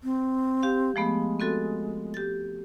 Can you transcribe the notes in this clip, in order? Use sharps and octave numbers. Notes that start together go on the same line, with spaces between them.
C4
G4 F5
F3 G#3 A3 B3
C4 F#4 A4
G4 A6